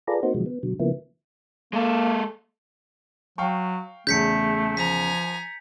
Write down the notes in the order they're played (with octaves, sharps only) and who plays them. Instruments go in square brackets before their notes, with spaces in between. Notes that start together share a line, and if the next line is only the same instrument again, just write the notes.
[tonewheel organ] F4 G#4 A4 B4 D5 A#5
A#3 C4 D#4 F#4 C5
B2 D#3 F3 F#3 G#3
B3
B2 D3 F#3
C#3 F3 A#3 B3 E4
[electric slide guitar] G#3 A4 [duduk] A#3
[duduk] F#3 [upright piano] F5 G5 C#6
[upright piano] E2 C#3 [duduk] A3 [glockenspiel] G6 B6 C#7
[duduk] F3 [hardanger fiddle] G#5 A#5 [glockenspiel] B6